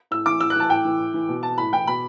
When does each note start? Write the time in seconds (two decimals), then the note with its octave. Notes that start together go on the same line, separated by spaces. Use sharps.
0.11 A2 E6
0.26 E3 D6
0.40 A2 E6
0.50 F#6
0.56 E3 A5
0.70 A2 G5
0.85 E3
0.99 A2
1.14 E3
1.28 B2
1.43 A5
1.58 A2 B5
1.73 E3 G5
1.87 B2 B5